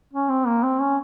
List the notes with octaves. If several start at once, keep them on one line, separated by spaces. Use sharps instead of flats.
C#4
C4
A#3
C4
C#4